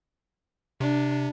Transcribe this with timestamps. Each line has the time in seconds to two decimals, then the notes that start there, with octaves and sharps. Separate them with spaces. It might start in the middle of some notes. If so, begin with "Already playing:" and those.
0.80 C3 D4